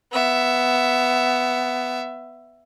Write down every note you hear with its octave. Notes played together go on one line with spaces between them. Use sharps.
B3 E5